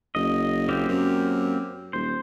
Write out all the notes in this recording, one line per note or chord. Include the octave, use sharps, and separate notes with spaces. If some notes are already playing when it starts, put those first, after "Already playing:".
F#1 D#5
A#3 C4 G4
F#2
D#1 C5